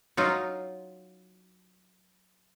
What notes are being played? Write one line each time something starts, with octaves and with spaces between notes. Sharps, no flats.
F#3 D#4 F4